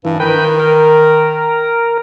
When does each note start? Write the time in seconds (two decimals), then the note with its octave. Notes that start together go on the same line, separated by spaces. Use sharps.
0.05 G2 E3
0.20 D#3 B4 G5
0.60 A#4